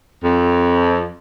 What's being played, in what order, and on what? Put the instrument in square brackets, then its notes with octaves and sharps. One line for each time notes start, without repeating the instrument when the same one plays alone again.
[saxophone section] F2